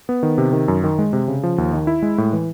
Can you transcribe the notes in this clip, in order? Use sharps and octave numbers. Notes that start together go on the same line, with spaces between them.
B3
D#3
C3
D#3
F#2
D#3
G#3
C3
C#3
F3
D#2
D#3
E4
G#3
A2
E3